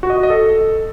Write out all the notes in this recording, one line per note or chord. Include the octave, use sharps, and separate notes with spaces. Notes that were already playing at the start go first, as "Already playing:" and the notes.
F#4
D#5
F#4
D#5
A4